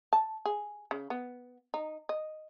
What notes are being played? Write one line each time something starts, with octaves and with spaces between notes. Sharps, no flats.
A5
G#4
C#3
B3
D#4
D#5